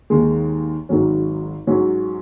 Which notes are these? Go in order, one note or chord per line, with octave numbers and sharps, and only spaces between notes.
D#2 D#3 G#3
G#1 G#2 D#3 F#3 C#4
G#2 F#3 C#4